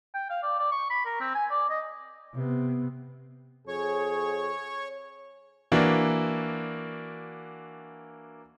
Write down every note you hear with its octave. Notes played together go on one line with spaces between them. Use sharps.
G5
F5
D5
D5
C#6
B5
A#4
C4
G#5
D5
D#5
C3 B3
F2 G#4 C#5 C#6
E3 A#3 D4 F#4